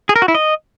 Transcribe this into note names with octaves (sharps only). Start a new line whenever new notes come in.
G#4
A#4
F#4
E4
D#5